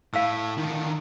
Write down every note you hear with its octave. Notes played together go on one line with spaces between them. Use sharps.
A2 F5 E6
D3 D#3